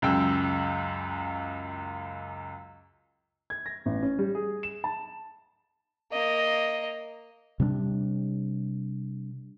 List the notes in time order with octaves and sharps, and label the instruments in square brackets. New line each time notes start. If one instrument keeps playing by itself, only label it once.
[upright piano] C#2 F#2 G5 E6
G#6
A#6
A1
C#4
G3
G#4
E7
A5
[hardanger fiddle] A#3 D#5
[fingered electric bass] C3 G3 C#4 D4